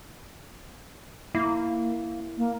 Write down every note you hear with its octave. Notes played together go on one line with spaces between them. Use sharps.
A#3 E4
A#3